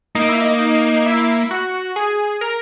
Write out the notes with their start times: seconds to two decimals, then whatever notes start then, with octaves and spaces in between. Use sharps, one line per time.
0.15 A#3 D#4
0.29 E4
0.41 D#4
1.06 E4
1.51 F#4
1.96 G#4
2.41 A#4